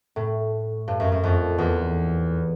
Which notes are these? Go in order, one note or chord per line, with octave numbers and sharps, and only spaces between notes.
A2
G2
F#2
F#2
F2
E2